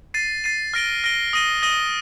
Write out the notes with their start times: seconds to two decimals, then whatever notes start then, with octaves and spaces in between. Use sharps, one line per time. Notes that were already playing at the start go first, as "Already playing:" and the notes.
0.14 A6 C7 D#7
0.44 A6 C7 D#7
0.74 F6 A#6 D7 G7
1.04 F6 A#6 D7 G7
1.33 D#6 A#6 D#7 G7
1.62 D#6 A#6 D#7 G7